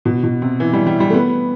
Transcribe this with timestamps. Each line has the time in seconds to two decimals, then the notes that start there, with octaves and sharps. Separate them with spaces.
0.05 B2
0.23 B2
0.42 C3
0.60 E3
0.73 G3
0.86 G3
1.00 G3
1.10 A3
1.14 B3